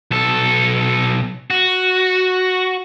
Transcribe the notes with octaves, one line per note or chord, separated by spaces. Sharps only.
B1 A4
F#4